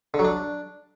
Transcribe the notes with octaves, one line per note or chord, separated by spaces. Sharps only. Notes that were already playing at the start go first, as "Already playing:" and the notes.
D3
F#3
D4